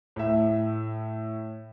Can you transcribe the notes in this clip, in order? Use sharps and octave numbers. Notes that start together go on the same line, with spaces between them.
A2 E5